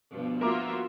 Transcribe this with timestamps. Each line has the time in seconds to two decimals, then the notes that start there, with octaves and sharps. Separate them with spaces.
0.11 G2 B2 F3
0.41 A#3 F4 F#4 A#4 E5 A#5 D6